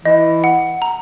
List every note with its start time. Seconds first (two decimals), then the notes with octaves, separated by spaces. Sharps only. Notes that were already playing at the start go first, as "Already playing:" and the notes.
0.05 E3 D#5
0.44 F#5
0.82 A#5